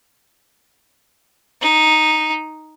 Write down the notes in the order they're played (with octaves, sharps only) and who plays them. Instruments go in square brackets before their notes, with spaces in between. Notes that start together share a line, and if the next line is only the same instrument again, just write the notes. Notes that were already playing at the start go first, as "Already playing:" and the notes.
[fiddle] D#4